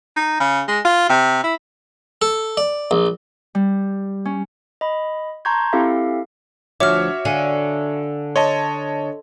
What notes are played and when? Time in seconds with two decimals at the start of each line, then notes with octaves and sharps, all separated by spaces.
0.16 D#4
0.40 C#3
0.68 G#3
0.85 F4
1.09 C3
1.44 E4
2.22 A4
2.57 D5
2.91 A#1
3.55 G3
4.25 C#4
4.81 D#5 B5
5.45 A5 A#5 C6 C#6 G6 G#6
5.73 C4 E4 G4 A4 E5 F5
6.80 D2 F3 F#4 C#5 E5 D6 F6
7.25 D3 F5 G#5 D#7
8.36 C#5 D#5 A5 C6